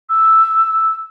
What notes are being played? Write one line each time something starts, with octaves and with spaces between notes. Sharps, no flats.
E6